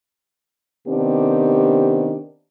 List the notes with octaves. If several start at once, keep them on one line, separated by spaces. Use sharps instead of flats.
C3 D#3 B3 C4 D4 G4